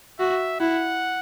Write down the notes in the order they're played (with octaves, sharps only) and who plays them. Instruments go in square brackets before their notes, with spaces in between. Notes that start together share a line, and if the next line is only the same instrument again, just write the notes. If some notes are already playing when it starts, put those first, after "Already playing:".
[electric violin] F#4 [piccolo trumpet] E5
[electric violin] E4 [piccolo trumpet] F#5